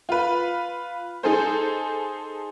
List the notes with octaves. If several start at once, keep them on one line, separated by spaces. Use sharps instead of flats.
F4 B4
D#4 G#4 A4 C5